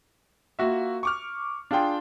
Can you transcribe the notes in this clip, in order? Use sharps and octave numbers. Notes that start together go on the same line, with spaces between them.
A#3 F4 F#4 E5
C#6 D6 F6
D4 F4 G#4 G5 C6